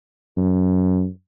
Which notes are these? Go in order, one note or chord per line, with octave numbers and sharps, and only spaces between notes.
F#2